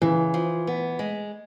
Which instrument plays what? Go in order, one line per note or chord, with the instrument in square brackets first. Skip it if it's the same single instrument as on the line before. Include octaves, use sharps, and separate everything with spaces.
[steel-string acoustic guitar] C#3 [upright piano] E3
[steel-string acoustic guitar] F3
B3
G#3